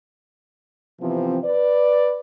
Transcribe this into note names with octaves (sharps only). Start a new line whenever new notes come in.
C3 E3 F3 B3 C4
B4 D5